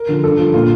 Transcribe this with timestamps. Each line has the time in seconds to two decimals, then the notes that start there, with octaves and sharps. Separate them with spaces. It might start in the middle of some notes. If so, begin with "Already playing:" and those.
Already playing: A#4
0.08 D3 F3
0.23 G2 A4
0.39 D3 F3
0.54 A#2 F4